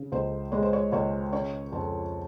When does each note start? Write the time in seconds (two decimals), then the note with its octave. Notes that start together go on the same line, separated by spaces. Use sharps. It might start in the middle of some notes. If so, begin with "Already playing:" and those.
Already playing: C#3
0.12 C#2 C5
0.52 G#3 C#5
0.63 C5
0.73 C#5
0.92 C#2 C#5
1.32 C#3 C#5
1.72 F2 C5